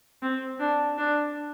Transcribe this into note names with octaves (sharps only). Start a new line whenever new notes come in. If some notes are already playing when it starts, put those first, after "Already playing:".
C4
D4
D4